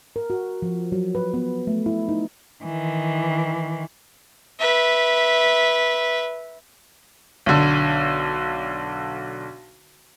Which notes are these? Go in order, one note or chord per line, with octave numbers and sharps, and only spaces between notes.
A#4
F#4
F3
F#3
B4
B3
A3
E4
D#4
D#3 E3
B4 E5
B1 D3